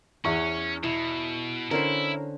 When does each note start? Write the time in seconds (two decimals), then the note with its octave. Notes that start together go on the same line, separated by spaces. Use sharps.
0.25 E2 C#4 F#5 C#6
0.83 B2 E4
1.71 D3 C#4 E4 A#4 C5